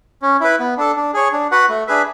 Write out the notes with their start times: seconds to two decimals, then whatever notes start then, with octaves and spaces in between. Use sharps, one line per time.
0.22 C#4
0.41 E4 B4
0.60 B3
0.77 D4 A4
0.96 D4
1.14 G#4 C#5
1.33 D4
1.51 F#4 B4 F#5
1.69 A3
1.87 D4 G#4 B4 E5